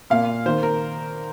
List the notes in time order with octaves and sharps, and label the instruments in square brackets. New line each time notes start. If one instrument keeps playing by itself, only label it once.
[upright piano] A#2 A#3 F5
D#3 A#3 C5
A#4